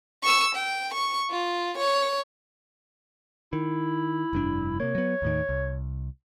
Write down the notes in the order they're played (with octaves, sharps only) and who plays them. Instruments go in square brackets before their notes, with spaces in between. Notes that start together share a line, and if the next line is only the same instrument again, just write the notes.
[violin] C#6 E6
G5
C#6
F4
C#5
[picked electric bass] D#3 [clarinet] E4
[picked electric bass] F1 G2 D4
[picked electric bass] C3 A#3 [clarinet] C#5
[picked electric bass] F#3 B3
D#2 A2 D#3
C2